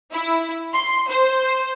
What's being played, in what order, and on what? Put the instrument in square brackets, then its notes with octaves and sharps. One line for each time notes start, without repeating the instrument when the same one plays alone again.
[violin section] E4
C6
C5